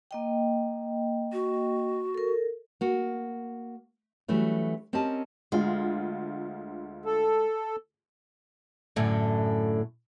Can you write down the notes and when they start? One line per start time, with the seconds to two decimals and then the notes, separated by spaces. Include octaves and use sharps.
0.11 A#3 D#5 G5
1.33 F#4
2.14 A4 A#4
2.81 A#3 F#4
4.28 E3 F#3 G3 A3 C#4
4.93 C4 C#4 G4 A#4 D#5 A5
5.52 D2 G#3 F4
7.05 A4
8.96 F#2 A2 D3